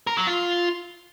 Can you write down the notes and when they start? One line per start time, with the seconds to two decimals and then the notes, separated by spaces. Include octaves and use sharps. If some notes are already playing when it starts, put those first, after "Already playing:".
0.07 A#4
0.17 F#3
0.27 F4